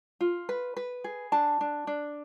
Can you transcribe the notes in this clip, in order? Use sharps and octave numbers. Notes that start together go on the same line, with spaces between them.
F4
B4
B4
G#4
D4 A5
D4
D4